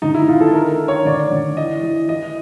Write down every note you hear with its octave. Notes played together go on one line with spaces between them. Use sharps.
D3 D#4
E4
D3 F4
A4
D#3 A#4
D#3
C#5
D3 D5
D3
E3 D#5
E3
E3 D#5